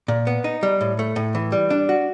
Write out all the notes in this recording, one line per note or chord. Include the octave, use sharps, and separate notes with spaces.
A#2
B3
D#4
G3
A2
A3
A2
E3
G3
D4
F#4